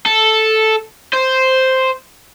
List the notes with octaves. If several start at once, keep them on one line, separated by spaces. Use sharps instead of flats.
A4
C5